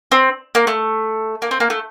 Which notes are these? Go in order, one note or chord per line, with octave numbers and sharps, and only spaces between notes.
C4
A#3
A3
A#3
C4
A#3
A3